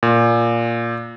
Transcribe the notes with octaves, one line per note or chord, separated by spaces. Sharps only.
A#2